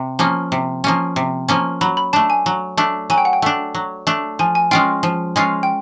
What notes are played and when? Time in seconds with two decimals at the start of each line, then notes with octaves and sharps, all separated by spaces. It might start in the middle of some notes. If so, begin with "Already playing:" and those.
Already playing: C3
0.19 F3 A#3 C#4
0.52 C3
0.84 F3 A#3 C#4
1.16 C3
1.48 F3 A#3 C#4
1.81 F#3 B5
1.97 B5
2.13 A3 D4 A5
2.30 G#5
2.46 F#3
2.77 A3 D4
3.10 F#3 G#5
3.18 G5
3.25 F#5
3.33 G5
3.42 A3 D4
3.75 F#3
4.07 A3 D4
4.39 F3 G#5
4.55 G#5
4.71 G#3 C#4 F4 G5
5.03 F3
5.36 G#3 C#4 F4
5.63 G5